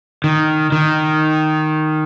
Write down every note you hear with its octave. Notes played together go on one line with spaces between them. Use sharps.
D#3
D#3